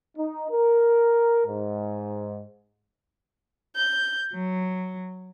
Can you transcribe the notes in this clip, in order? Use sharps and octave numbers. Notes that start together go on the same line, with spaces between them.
D#4
A#4
G#2
G6
F#3